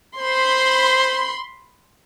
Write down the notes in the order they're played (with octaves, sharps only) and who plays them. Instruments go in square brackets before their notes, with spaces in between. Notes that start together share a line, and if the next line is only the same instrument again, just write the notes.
[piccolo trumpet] C5 [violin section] B5 C6